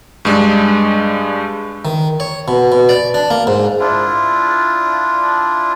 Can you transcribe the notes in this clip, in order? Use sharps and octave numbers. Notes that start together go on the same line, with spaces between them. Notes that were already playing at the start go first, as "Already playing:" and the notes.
G2 G#3 D4
D#3
C#5
B2
B2
D5
D4
A#3
G#2
D4 E4 F4